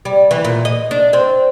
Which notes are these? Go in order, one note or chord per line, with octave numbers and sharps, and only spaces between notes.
G3
E3
A#2
D#5
D4
C4